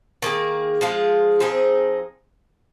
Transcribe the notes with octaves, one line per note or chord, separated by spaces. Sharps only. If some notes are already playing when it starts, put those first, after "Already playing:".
D#3 A#3 G#4
F3 G#3 F4 G#4
F3 C4 D#4 G#4